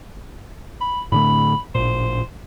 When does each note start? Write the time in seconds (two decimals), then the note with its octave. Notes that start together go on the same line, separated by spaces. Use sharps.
0.81 B5
1.12 A2 D3 A3 B5
1.75 A1 A#2 C5